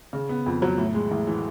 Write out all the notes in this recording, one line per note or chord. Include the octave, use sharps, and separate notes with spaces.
C#3
B3
F2
F#3
A2
G#3
A1
E3